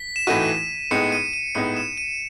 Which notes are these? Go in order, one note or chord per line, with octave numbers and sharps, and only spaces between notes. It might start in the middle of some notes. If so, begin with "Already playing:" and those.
Already playing: B6
E7
A2 E3 A3 D#4 F#4 D#7
A2 G#3 B3 D#4 C#7
D#7
D#7
A2 G#3 B3 D#4 C#7
E7
D#7